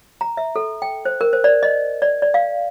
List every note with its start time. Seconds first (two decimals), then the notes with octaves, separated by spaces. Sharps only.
0.21 A#5
0.37 E5
0.56 A4
0.82 G5
1.05 C5
1.21 A#4
1.33 C5
1.44 D5
1.63 D#5
2.02 D5
2.22 D5
2.34 F5